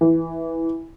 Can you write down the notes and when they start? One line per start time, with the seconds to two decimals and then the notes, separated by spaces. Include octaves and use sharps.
0.01 E3